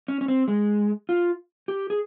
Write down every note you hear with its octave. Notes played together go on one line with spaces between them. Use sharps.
C#4
C#4
C4
G#3
F4
G4
G#4